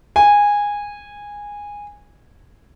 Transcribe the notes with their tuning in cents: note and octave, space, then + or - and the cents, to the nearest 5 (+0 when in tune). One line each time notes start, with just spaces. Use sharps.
G#5 -15